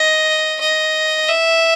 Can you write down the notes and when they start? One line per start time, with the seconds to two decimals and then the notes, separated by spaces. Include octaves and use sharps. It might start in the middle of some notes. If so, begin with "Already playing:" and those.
Already playing: D#5
0.60 D#5
1.28 E5